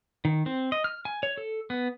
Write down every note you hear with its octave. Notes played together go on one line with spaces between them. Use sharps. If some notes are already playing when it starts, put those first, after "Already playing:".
D#3
C4
D#5
F6
G#5
C#5
A4
B3